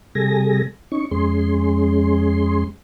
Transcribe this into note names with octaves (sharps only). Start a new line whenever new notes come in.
C3 G3 G#4 A4 G#5 A#6
C#4 D#4 C#6
F2 G#3 C#4 G#4 C6